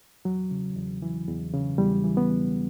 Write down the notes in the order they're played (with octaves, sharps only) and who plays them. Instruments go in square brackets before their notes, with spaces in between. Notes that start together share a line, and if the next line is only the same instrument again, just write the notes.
[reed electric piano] E2 F#3
C#3
E2
E3
E2
C#3
E2 G3
E3
B3
E2